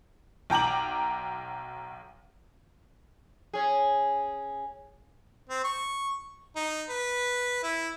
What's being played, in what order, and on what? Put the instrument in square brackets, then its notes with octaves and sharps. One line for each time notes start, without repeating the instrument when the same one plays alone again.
[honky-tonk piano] B1 G5 A#5 D6 F#7
[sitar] C#4 G#4
[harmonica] C4
C#6
D#4
B4
E4